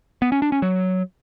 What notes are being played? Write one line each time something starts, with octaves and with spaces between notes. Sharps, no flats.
B3
C#4
D4
C#4
F#3